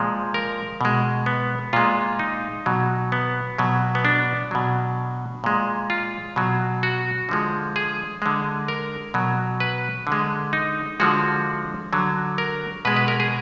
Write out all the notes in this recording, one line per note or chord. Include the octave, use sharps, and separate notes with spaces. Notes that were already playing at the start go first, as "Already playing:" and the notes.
Already playing: A#2 F3 G#3
A#4
B2 G#3
B3
A#2 G#3 F4
D#4
B2 F#3
B3
B2 F#3
B3
D4
B2 F#3
A#2 G#3
F4
B2 F#3
F#4
D3 F3 G#3
G#4
D3 G#3
A#4
B2 F#3
B4
D3
G#3
D#4
D3 F3 G#3 F#4
D3 F#3
A#4
B2 G#3 B4
B4
A#4
G#4